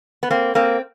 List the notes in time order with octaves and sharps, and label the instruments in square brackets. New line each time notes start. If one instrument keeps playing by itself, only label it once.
[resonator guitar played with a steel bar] B3
A#3 C4
A#3 C4